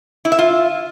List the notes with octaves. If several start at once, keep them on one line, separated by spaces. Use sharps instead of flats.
E4
E5
F4